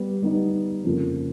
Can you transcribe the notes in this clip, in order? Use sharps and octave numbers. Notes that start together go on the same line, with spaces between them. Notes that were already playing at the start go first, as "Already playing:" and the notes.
Already playing: G3 B3
G3 B3 D#4
F2 C#3 F3 A#3